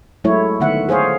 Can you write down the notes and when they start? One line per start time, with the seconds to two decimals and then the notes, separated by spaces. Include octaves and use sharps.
0.24 F#3 G#3 A3 E4 C#5
0.60 D3 D#3 A3 B3 E5 F#5
0.89 G#4 C5 C#5 F5